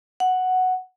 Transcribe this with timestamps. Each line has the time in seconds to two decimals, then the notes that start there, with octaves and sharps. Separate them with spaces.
0.20 F#5